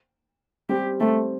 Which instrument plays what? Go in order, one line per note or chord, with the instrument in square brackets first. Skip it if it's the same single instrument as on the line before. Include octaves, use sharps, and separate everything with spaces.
[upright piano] G3 C4 [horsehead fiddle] G4
[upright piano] G3 C4 [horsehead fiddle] A3